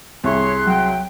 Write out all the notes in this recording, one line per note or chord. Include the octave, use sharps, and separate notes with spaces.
C2 G#4 C#5 C6 F#6
F#3 G5